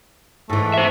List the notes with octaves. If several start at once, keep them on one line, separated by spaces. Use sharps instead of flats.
G#2 E3 A3
C5 E5